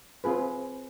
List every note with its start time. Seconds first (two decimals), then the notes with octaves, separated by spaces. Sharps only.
0.24 C4 F4 G#4 B4